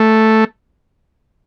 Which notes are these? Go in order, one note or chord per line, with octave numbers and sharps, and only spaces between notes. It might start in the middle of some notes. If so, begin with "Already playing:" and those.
Already playing: A3